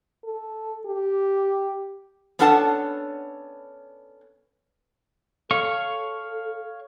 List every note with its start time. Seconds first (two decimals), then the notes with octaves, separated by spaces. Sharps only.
0.24 A4
0.86 G4
2.39 B3 C#4 D4 A4 F#5 A5
5.51 A4 C#5 F5 C#6